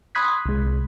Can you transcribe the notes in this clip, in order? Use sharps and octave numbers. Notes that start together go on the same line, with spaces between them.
B5 C6 D#6 F#6 G#6 B6
C2 G#3